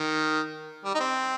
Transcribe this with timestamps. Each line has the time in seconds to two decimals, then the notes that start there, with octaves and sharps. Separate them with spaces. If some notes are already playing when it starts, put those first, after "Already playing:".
Already playing: D#3
0.85 G3
0.95 D#4
1.00 C4